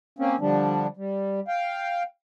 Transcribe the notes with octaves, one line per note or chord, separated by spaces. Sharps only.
A#3 C4 C#4
D3 F3 G3 D4
G3
F5 G5